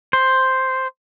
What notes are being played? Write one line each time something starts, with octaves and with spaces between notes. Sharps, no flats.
C5